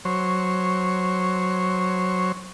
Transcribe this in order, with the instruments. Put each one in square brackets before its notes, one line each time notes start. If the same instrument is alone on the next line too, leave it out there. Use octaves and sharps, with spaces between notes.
[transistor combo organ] F#3 C5 C#5